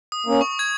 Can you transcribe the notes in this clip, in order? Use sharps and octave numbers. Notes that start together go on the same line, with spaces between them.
D#6
A#3 C#4
C#6
G#6